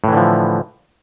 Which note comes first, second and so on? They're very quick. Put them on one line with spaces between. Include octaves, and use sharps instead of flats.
A2 E3 D3 F3